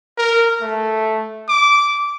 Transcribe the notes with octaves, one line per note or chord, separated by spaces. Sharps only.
A#4
A3
D6